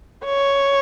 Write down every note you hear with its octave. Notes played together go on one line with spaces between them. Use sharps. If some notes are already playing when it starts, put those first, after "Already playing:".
C#5